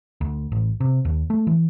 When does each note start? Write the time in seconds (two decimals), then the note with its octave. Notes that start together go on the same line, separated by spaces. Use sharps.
0.21 D2
0.52 A1
0.80 C3
1.05 D#2
1.30 A3
1.47 E3